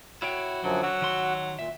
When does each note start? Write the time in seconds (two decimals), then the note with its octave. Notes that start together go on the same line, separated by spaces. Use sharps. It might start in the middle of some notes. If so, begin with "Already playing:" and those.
0.22 E4 F#4 C#5 G5
0.64 F#2 D3 F3 F#3
0.83 F#3 F#4 F#5 E6
1.02 D#3 C6
1.59 A#2 E5